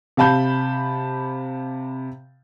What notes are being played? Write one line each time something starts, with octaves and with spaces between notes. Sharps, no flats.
C3 F5 A5 B5 G6